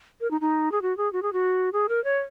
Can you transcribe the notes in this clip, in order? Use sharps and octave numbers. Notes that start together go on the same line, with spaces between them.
A#4
D#4
D#4
G#4
F#4
G#4
F#4
G#4
F#4
G#4
A#4
C#5